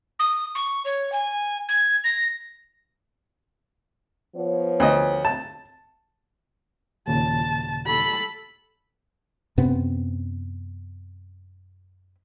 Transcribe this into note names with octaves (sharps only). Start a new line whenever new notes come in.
D#6
C#6
C#5
G#5
G#6
A#6
F3 B3 C#5
D2 D#5
A5
D#2 A#2 C#3 A5
A4 B5
F#2 C3 B3 C4